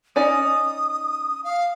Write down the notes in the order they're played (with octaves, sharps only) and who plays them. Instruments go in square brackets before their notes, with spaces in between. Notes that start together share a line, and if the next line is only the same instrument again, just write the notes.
[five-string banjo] C#4 D#4 D5 [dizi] D#6
[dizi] F5